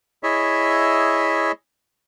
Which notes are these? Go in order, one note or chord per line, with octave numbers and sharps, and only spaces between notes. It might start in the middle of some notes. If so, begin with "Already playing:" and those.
E4 G#4 C#5 D#5 E5